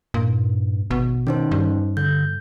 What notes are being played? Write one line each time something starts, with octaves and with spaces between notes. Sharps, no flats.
G2 A#2
G#1 B2
D#3 C#4 D#4 C5
G2
D3 G6